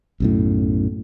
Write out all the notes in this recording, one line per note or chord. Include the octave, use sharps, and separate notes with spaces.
B1 F#2 A2